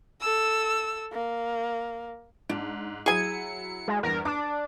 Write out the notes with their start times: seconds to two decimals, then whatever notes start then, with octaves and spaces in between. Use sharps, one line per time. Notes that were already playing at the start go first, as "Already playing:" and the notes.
0.20 A4 E6
1.12 A#3
2.49 G#2 D4
3.06 F#3 E4 G#4 G#5 C#7
3.88 G#3
4.03 E2 G2 A#4
4.25 D4 D6